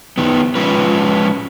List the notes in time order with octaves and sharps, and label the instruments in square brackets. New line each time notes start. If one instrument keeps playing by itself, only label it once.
[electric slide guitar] D#3 B3
F3 G#3 C#4 F4 B4